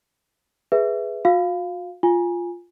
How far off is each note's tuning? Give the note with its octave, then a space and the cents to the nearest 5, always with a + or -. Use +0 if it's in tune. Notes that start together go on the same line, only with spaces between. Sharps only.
G#4 +0 B4 +0 E5 +0
F#4 -45 F5 +0
F4 +0 G#5 -10